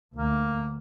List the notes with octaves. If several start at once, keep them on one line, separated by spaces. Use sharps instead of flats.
D2 A#3